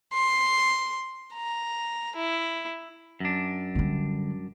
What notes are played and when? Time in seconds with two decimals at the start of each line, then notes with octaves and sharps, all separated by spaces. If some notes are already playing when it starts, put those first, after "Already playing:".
0.13 C6
1.34 A#5
2.16 E4
3.20 F#2 D4
3.75 D3 G3